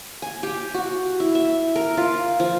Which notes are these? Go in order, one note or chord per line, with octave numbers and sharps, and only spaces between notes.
G#5
G4
F#4
E4
E5
A#4
F4
F3